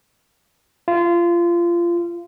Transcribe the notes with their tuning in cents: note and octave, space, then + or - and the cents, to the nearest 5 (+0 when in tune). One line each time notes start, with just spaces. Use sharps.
F4 -25